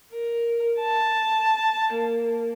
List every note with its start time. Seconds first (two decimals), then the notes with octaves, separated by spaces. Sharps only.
0.12 A#4
0.79 A5
1.93 A#3